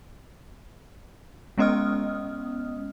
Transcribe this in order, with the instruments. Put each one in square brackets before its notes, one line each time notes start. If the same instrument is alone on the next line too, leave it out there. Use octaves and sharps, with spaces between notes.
[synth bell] G#3 B3 C#4 D#5 D#6 F6